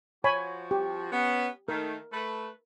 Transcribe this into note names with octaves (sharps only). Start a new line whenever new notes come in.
F3 F#4 C#5 G#5 B5
G4
B3 C#4
D#3 A3 A#4
A3 B4